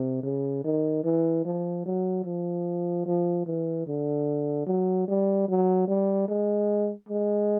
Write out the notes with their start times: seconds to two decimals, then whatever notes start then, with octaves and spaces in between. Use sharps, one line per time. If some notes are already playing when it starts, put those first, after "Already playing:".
Already playing: C3
0.23 C#3
0.64 D#3
1.04 E3
1.45 F3
1.86 F#3
2.25 F3
3.06 F3
3.46 E3
3.86 D3
4.66 F#3
5.08 G3
5.48 F#3
5.88 G3
6.28 G#3
7.09 G#3